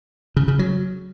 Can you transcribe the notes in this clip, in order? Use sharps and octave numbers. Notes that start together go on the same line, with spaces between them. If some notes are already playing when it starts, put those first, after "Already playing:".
C#3
C#3
F#3